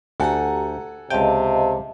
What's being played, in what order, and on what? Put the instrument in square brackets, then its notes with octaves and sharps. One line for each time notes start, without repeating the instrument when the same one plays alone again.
[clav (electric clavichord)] D2 [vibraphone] G4 A#5 [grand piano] A4 F#5 G#5
[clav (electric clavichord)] C#2 G5 [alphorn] C3 [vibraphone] D#5 F5 A5